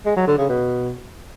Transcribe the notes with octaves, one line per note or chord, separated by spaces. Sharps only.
G#3
F#3
D3
C#3
B2